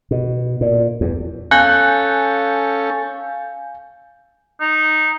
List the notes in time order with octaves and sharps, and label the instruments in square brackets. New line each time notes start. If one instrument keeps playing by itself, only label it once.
[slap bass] B2
A#2
E2
[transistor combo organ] C#4 A4 [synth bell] F5 G#5 G6 [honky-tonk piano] F#6
[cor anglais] D#4